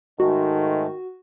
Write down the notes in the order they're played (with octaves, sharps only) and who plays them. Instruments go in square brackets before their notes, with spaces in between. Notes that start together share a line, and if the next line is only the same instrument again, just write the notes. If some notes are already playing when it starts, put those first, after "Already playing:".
[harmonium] G#2 G#3 A3 [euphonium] D#3 [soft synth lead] F#4